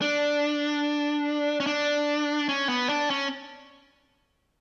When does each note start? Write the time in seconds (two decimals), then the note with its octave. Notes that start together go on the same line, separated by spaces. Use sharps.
0.02 D4
1.60 C#4
1.66 D4
2.49 C#4
2.69 B3
2.89 D4
3.10 C#4